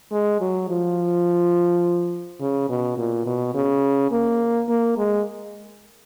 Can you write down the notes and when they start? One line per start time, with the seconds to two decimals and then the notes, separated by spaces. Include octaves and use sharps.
0.12 G#3
0.40 F#3
0.69 F3
2.41 C#3
2.69 B2
2.97 A#2
3.26 B2
3.55 C#3
4.11 A#3
4.69 A#3
4.97 G#3